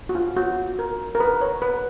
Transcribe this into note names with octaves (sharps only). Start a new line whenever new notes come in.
F#4
F4
F#4
A#4
A#4
B4
C#5
B4